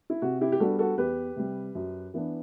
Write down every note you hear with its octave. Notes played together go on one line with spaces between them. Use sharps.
E4
C3 F#4
E4 G4
G4
G3 B3 D4 F#4 A4
F#4 A4
E2 G4 B4
C3 G3
F#2
E3 B3 D4